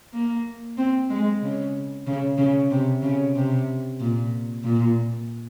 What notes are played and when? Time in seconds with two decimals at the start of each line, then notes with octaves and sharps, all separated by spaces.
0.13 A#3
0.78 C4
1.10 G#3
1.42 C#3
2.07 C#3
2.38 C#3
2.71 C3
3.02 C#3
3.36 C3
4.00 A#2
4.64 A#2